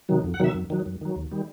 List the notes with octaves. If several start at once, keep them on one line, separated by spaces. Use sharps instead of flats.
C3 D#3 F#3
F2
F#5
C3 D#3 F#3 E5
F#2
D#3 F#3
F#2
D#3 F#3
D#2
D#3 G3